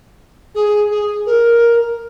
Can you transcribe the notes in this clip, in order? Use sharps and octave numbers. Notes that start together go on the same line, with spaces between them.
G#4
G#4
A#4